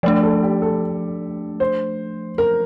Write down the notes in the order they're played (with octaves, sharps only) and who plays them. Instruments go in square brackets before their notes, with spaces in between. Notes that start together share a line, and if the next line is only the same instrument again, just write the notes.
[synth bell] F3 A3 D4 [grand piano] D5
[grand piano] A4
G4
A4
C5
A#4